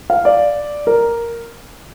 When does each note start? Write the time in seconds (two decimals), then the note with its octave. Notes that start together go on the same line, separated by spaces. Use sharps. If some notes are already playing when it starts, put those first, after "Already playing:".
0.10 F5
0.25 D5
0.87 A#4